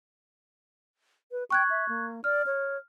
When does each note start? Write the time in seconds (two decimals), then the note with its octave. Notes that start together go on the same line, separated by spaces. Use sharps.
1.32 B4
1.50 G5 C#6 F#6 G#6
1.70 E5
1.88 A#3
2.24 D5 F6
2.46 C#5